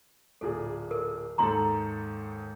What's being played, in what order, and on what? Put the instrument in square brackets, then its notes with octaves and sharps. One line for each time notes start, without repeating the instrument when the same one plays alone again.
[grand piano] D1 A#2 G#4 [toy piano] A4
[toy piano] A4 A#4
[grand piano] D#2 G#2 A4 [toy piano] A#5 C6